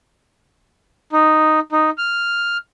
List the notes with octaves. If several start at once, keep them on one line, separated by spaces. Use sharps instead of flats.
D#4
D#4
F6